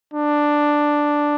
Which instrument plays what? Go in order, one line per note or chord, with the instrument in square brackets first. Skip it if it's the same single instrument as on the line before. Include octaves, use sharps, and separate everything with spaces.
[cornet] D4